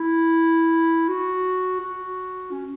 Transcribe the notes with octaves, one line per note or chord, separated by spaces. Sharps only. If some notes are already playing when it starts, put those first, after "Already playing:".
Already playing: E4
F#4
F#4
C#4